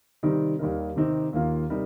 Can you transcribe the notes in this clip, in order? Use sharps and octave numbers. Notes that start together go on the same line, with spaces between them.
C3 D#3 G3 C4 D#4
D#2 D#3 G3 D#4 A#4
C3 D#3 C4 D#4 G4
D#2 D#3 A#3 F4
C3 G3 D#4 A#4